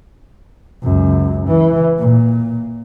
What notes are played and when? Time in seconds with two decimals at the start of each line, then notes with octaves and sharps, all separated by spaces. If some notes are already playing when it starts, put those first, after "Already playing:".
0.83 C#2 F#2
1.48 E3
1.98 A#2